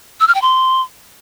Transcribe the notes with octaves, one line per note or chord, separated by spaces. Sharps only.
E6
F6
G5
C6